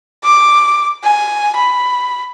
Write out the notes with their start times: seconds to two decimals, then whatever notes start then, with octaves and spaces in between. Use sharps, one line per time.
0.24 D6
1.03 G#5
1.56 B5